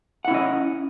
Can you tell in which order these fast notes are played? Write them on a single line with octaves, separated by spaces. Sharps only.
F#5 E4 C#4 D#5